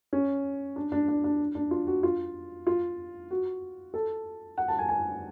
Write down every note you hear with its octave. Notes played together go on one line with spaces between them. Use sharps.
C#4
D4
D4
D4
D4
D4
F4
F#4
F4
F4
F#4
A4
F#5
A5
G#5
G#5